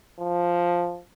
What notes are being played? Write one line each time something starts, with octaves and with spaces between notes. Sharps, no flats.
F3